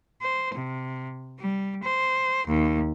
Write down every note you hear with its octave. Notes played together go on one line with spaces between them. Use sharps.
C5
C3
G3
C5
D#2